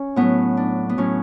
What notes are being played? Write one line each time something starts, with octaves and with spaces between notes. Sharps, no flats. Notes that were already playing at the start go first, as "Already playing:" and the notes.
Already playing: C#4
A2 F#3 B3
D4
B3
A2 F#3 C#4